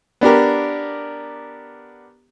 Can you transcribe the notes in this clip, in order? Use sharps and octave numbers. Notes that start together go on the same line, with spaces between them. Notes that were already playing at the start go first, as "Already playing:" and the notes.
B3 D4 G4 A#4